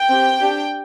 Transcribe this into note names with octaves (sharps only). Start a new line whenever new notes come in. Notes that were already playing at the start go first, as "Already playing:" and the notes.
Already playing: G5
C4 G4
D4 G4